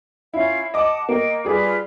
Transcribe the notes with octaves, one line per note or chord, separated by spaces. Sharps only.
C#4 E4 F4 F5
D#5 F#5 A5 D6
A#3 D#5 G5
G3 F4 G#4 B4 D5